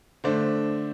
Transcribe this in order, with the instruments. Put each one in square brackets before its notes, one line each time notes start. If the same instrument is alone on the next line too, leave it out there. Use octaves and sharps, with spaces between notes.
[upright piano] D3 A3 D4 C5